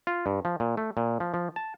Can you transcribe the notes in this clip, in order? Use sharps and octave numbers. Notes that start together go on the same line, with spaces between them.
F4
G2
F3
A#2
A3
A#2
F3
F3
A5